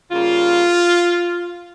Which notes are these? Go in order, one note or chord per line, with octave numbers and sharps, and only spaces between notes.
C#3 G3 A#3 F4